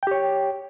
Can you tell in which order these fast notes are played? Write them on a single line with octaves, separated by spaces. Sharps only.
G5 G4 C#5